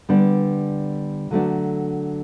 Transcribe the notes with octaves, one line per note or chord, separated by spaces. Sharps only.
D3 G3 B3 D4
D3 F#3 A3 D4